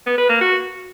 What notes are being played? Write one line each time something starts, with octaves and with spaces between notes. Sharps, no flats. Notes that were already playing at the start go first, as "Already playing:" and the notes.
B3
B4
A#3
F#4